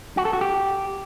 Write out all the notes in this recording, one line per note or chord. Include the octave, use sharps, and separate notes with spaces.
F#4
A4
F#4
G4